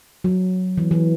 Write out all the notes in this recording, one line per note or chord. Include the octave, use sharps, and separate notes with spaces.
F#3
E3
E3